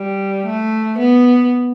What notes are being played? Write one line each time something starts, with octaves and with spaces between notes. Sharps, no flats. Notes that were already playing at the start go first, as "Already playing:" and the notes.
Already playing: G3
A3
B3